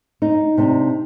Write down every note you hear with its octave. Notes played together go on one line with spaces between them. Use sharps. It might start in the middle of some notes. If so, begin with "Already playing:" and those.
D#4
C3 D4 D#4